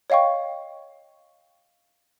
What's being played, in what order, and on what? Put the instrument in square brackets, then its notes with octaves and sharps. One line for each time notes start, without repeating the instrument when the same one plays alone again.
[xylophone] C#5 D#5 F5 G5 C#6